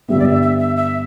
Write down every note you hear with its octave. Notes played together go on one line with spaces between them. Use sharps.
G2 D3 G3 B3 E5
D5
E5
E5
E5
E5